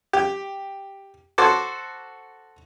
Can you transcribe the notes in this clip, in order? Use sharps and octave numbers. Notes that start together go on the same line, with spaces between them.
G4
F#4 A4 C5 D6